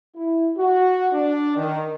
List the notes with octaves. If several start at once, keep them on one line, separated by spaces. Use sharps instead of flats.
E4
F#4
D4
D#3